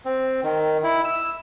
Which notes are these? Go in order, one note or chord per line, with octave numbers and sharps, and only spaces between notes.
C4
D#3
E4
E6